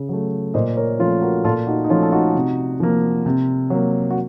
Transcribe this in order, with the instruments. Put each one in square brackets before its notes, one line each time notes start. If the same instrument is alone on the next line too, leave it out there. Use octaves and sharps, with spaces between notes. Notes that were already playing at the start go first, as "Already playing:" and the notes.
Already playing: [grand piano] C#3
F#3 A3
A#2 C5 D#5
A#4 C#5
F3 A3 C#4 F4
F#4 A#4
A#2 F4 A4
D#4 F#4
D#4
F3 A3 C#4 F4
A4
D#4 F#4
C3
F3 A#3
C3
F#3 A#3
F#4